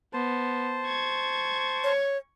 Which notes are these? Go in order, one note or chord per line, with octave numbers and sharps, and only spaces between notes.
B3 C5 A5
C#6 G#6
C#5